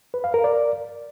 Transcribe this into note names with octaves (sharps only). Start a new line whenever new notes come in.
B4
F5
A#4
D5